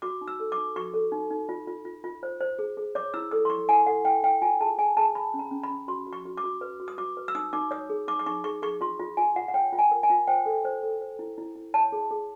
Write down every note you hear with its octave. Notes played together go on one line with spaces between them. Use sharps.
F#4 D6
D#4
E6
A4
D6
D#4
F#4 C#6
A4
D#4
D#4
F4
F4
F4
F4
C5
C5
G#4
G#4
C#5 D6
E4 E6
A4 D#6
C6
E4 C#6
E4 G#5
A4 F#5
E4 G5
E4 G5
F4 G#5
G#4 A5
G#4 G#5
G#4 A5
G#4 B5
C#4
A#5
C#4
B5
C#4
F#4 C6
F#4
C#6
F#4
D6
F#4
B4
F#4
D#6
F#4 D6
B4
E6
D#4 D#6
D#4 D6
C#5 D#6
G#4
D#4 D6
D6
D#4 C#6
G#4 C#6
G#4 C#6
F4 C6
F4
F4 G#5
F4 F#5
F#5
C#5 G5
F4
G#5
A#4
G#5
F4
C5 G5
A4
C5
A4
C5
E4
E4
E4
C#5 A5
G#4
G#4